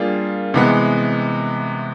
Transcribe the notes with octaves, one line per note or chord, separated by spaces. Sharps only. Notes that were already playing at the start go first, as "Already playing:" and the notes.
Already playing: G3 A#3 D4 F4 G#4
C3 E3 G#3 B3